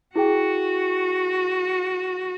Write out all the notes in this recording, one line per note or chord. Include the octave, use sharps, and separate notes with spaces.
E4 F#4 G#4 G5